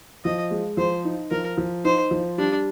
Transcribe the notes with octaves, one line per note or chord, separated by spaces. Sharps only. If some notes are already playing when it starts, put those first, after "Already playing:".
F3 D#5
G#3
F3 C5
D#4
F3 A#4
F3
D#4 C5
F3
G3 D4